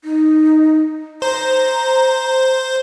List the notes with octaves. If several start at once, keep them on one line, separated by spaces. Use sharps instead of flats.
D#4
C5 A#5